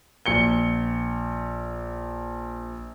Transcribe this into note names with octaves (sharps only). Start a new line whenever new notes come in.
A#1 C#7 G7